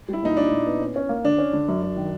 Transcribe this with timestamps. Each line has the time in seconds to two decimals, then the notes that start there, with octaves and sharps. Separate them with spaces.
0.08 G3 E4
0.23 A#2 D#4
0.37 A#2 D4
0.51 A#2
0.66 B3
0.81 C#4
0.96 C#4
1.09 A#3
1.24 D3 D4
1.38 C#4
1.53 D3
1.68 F#2
1.82 F#2
1.96 D#3